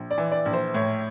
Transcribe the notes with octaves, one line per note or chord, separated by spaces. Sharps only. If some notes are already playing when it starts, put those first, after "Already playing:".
Already playing: A#1
D5
E3
D5
A#1
C5
A2 C#5